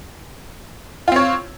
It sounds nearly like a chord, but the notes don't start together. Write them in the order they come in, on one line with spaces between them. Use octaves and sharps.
F4 C4 C#5